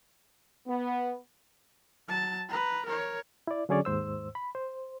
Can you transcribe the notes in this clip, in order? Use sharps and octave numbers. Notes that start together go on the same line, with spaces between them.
B3
F#3 A5
B4 A#5
A#4 C#5
E4 D5
D3 F#3 C#4 G#4 C#5 D5
D#2 G#2 C5 E6
B5
C5